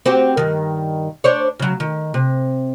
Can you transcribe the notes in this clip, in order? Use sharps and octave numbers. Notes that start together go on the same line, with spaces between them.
C4 F#4 G4
G2 D#3
D4 C5 C#5
C#3 F#3
D#3
C3